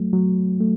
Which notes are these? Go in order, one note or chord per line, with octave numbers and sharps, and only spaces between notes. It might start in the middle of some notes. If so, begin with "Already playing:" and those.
Already playing: F#3 A3
F#3
A3